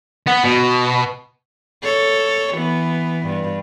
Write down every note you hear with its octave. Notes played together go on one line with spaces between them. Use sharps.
B3
B2
A4 C#5
E3 B3
G2